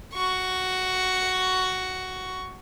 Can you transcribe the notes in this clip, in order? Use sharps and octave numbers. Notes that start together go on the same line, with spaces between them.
F#4 C#6